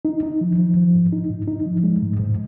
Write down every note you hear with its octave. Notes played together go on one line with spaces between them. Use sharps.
D#4
D#4
F3
F3
F3
G#2
D#4
G#2
D#4
F3
G#3
G#2
G#2